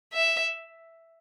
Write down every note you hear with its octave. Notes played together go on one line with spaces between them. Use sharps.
E5